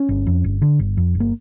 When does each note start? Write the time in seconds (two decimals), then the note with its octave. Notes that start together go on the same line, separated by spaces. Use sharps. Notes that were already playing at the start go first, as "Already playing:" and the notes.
Already playing: C#4
0.09 G1
0.27 F2
0.44 G1
0.62 D3
0.79 G1
0.97 F2
1.15 G1
1.20 A#3